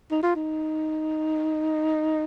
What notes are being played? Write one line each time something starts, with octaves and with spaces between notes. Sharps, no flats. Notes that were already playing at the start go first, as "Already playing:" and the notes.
D#4
F4
D#4